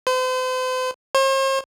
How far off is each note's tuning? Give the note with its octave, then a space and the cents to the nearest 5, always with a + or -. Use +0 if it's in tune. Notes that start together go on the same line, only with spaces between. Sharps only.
C5 -40
C5 +45